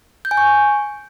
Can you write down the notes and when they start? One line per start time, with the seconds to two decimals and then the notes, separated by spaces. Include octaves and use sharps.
0.25 G6
0.31 G#5
0.37 C#6